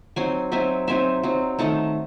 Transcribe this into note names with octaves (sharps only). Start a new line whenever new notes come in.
F#3 C4 D#4 G#5 C6
F#3 C4 D#4 E5 G#5
F#3 C4 D#4 E5 G#5
F#3 C4 D#4
D#3 A3 D#4 F#5 A5